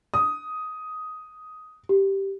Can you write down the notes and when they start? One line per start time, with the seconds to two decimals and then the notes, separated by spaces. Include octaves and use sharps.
0.14 D#6
1.89 G4